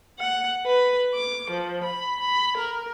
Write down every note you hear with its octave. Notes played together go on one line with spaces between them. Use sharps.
F#5
B4
D6
F3
B5
B5
A#4